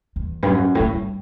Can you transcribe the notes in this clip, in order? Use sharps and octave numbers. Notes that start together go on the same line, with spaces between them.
E2
G2
F#2
A2
G2